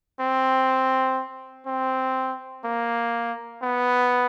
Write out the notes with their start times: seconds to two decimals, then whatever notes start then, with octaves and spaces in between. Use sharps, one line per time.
0.20 C4
1.67 C4
2.65 A#3
3.62 B3